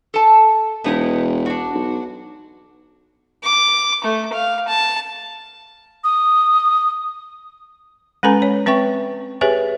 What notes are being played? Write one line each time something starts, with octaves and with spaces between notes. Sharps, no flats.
A4 A5
E1 B3 D#4 E4
D4 F#4
B1
D6
A3
F5
A5
D#6
G#3 C#4 A4 B4 G#5 A#5
C#5
C4 B4 E5 G5 C#6
G4 G#4 B4 C#5 E5 G#5